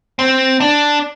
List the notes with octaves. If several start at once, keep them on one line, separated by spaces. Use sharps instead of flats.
C4
D4